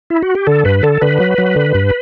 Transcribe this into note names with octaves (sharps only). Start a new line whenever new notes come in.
E4
F#4
G4
D3 A4
G2 B4
D3 A4
D3 B4
F#3
F#3
D3
G2